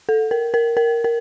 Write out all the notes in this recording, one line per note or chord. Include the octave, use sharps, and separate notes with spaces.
A4
A#4
A#4
A#4
A#4